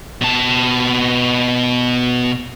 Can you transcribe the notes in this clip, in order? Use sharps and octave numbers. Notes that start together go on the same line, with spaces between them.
B2 A5